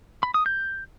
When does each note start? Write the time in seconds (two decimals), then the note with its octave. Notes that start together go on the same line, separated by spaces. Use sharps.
0.23 B5
0.34 D#6
0.46 G6